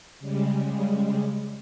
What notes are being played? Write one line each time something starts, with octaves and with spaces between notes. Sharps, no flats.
C#3 G3 G#3